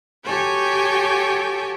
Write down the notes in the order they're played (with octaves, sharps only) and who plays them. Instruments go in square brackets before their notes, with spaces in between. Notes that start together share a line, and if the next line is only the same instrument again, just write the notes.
[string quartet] F#4 G4 A4 C#5 G5 G#5